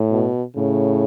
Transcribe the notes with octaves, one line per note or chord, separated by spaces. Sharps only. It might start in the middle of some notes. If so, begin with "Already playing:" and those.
Already playing: A2
B2
A2 C#3